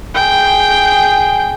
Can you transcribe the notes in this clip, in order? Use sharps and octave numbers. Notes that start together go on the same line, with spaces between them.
G#4 G5